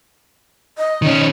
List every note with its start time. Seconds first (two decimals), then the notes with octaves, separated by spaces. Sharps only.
0.78 D#5
1.02 D#3 C#4